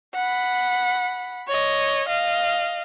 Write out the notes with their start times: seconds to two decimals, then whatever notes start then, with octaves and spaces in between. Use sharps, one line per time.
0.15 F#5 B5
1.48 C#5 D#5
2.08 D#5 F5